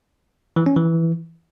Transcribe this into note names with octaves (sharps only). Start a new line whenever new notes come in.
E3
C#4
E3